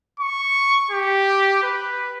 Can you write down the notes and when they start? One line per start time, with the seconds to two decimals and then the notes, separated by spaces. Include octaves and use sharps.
0.20 C#6
0.91 G4
1.63 B4